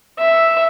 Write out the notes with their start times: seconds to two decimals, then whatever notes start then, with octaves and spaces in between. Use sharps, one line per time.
0.19 E5